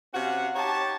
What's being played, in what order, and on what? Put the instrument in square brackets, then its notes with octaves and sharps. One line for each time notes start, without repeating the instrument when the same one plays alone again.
[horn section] C3 C#4 F#4 F5 F#5
D#4 G4 C#5 A5